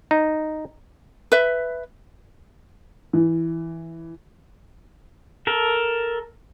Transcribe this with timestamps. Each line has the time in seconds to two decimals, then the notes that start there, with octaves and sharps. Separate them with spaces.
0.11 D#4
1.32 B4 E5
3.13 E3
5.47 A4 A#4